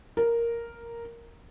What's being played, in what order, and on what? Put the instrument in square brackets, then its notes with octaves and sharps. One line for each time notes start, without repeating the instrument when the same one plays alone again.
[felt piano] A#4